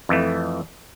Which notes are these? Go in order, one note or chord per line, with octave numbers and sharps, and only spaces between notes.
F2 E3 A3